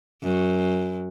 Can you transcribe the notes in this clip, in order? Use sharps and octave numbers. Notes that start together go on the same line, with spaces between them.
F#2